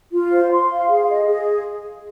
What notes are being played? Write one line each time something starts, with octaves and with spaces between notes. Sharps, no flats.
F4
C5
C6
F5
G#4
D#5
G#4